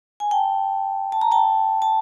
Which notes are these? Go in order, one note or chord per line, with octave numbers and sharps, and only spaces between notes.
G#5
G5 A5
A5
A#5
G5 A5
A5